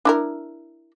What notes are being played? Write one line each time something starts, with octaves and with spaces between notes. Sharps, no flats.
D4 E4 A#4